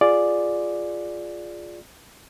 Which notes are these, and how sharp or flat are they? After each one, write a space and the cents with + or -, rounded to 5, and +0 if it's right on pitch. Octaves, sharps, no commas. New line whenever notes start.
F4 +0 G#4 +0 D5 +0